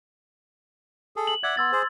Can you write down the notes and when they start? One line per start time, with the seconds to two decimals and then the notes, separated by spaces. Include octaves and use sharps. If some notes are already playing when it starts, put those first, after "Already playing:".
1.16 G#4 A4
1.27 F#7
1.44 D5 E5 F#5 G#6
1.57 B3 C6 E6 A6
1.72 G#4 C5